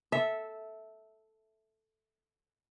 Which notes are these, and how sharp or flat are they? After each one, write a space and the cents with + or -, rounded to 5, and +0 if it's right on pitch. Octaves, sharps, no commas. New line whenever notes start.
A4 +0 E5 -10